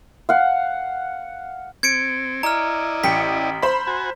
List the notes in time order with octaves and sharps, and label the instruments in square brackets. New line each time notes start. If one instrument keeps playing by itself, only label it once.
[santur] F5 F#5
[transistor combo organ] C4 [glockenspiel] G#6 C#7 D7
[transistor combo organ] E4 D5 D#5 [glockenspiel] A#5 F6
[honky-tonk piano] A1 G5 C#7 [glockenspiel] B6
[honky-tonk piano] C5 B5
[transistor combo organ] F#4 G#5